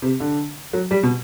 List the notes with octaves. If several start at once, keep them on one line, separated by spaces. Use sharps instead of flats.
C3
D3
F#3
G3
B2